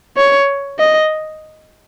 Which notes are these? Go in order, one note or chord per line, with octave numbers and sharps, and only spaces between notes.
C#5
D#5